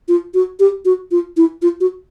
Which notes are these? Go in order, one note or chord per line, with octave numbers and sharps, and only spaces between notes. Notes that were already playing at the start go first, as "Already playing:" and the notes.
F4
F#4
G4
F#4
F4
E4
F4
F#4